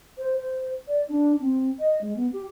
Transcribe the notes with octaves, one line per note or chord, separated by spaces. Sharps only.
C5
C5
D5
D4
C4
D#5
G#3
B3
G4